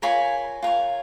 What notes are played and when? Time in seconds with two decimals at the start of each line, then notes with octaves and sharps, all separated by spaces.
0.02 F4 A#4 C#5 G#5 B5
0.62 F4 A#4 C#5